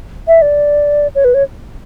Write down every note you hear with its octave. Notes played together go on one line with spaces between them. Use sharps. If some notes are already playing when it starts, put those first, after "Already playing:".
E5
D5
C#5
B4
C#5